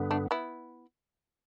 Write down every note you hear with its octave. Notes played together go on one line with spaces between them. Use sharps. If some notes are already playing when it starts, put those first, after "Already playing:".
Already playing: G2 D3 B3
A3 D4
B3 E4